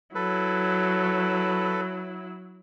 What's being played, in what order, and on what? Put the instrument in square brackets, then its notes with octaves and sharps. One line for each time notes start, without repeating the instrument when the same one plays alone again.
[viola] F#3 E4 [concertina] A4 B4